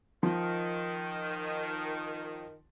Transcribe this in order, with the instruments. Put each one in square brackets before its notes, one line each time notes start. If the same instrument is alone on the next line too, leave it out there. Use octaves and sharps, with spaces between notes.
[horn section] D#3 [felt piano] F3